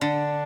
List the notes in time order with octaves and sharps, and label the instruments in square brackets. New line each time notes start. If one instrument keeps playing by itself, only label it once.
[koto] D3 [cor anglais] D4